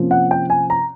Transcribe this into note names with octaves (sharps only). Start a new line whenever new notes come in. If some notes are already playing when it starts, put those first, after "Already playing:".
Already playing: C3 F3 A#3 C#4
F#5
G5
G#5
A#5